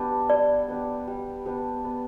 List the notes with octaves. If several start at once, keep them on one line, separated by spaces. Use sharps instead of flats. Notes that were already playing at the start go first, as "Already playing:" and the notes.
Already playing: G3 B3 D4 G4
G3 D5
B3 D4 G4
G3
B3 D4 G4
B3